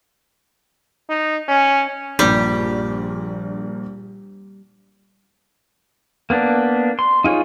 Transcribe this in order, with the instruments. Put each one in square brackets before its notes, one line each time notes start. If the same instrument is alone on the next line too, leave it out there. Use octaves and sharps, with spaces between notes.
[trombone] D#4
C#4
[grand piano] A#1 G2 A#2 [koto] G3
[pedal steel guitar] A#3 B3 D4
C6
D#4 F4 G#4 C#5